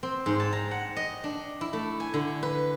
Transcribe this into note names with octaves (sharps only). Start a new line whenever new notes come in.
C4
G#2
A5
A#5
F#5
D#5
D4
E4
A3
G#5
D3
B4